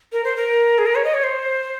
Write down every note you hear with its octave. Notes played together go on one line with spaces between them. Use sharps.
A#4
C5
A#4
G#4
A#4
C#5
D#5
C#5
C5